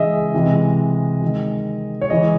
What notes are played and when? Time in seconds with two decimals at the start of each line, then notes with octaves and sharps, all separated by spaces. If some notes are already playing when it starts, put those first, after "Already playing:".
Already playing: C#3 E3 G#3 G#4 D#5 E5
0.34 C3 E3 G#3
1.22 D#3 G#3
2.01 C#5
2.10 C#3 E3 G#3 D#5